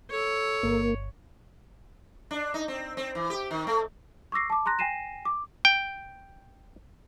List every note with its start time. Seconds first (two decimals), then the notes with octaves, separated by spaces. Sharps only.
0.11 A4 C#5
0.63 G1 A#3
2.31 D4
2.54 D#4
2.68 C4
2.97 C4
3.15 E3
3.30 G4
3.51 D#3
3.67 A3
4.32 C#6 D6 E6 A#6 C7
4.50 A5 D6
4.66 A#5 C6 F#6 A#6
4.79 G5 G#5 A#6 C7 D#7 E7
5.25 D6
5.65 G5